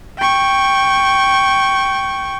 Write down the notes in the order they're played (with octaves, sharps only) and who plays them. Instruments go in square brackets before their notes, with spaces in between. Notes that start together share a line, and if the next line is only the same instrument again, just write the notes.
[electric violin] G5 C#6